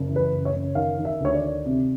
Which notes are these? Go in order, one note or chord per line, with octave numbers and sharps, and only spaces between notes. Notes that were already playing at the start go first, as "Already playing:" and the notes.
Already playing: F#1
E3
B4
F#1
C#5
F#1
D#3 F5
D#3
E5
D2 C#5
D5
D#3
C3